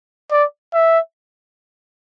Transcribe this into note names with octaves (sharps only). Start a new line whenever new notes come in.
D5
E5